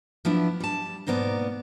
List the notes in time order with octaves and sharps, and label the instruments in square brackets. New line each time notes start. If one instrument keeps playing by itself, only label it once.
[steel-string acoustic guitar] F3 B3 D4 E4
G3 A5
G#2 B2 A#3 B3 D5